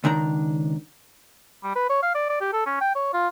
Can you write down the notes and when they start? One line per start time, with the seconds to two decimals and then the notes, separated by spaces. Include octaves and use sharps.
0.04 C#2 D#3 D4 A#5
1.63 G3
1.75 B4
1.90 C#5
2.03 F5
2.15 D5
2.29 D5
2.41 G4
2.53 A4
2.66 C#4
2.81 G5
2.95 C#5
3.13 F4